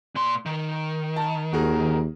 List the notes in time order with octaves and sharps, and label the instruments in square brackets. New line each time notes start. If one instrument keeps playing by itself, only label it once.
[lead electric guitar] A#2 C6
D#3
[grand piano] A5
[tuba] D#2 [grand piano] F#4 G#4 A#4